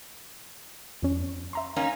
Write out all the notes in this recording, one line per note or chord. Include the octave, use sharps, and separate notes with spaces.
F2 C#4
E5 A#5 C6
A#3 C#4 D#4